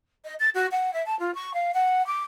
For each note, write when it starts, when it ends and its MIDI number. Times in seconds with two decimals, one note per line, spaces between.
0.24 0.34 75
0.39 0.49 93
0.54 0.66 66
0.71 0.93 78
0.93 1.03 76
1.06 1.17 81
1.19 1.34 65
1.35 1.53 85
1.54 1.71 77
1.74 2.05 78
2.07 2.23 86